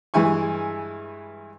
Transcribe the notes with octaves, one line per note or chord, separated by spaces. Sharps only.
G2 E3 G#3 E4 G#5 C#6